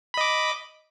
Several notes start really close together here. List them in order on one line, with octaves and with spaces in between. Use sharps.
B5 D#5 D6